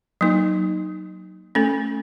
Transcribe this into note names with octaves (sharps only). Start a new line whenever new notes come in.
F#3 A#3 D#4
A3 C#4 A4